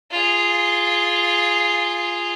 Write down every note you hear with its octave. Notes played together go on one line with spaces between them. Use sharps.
F4 G#4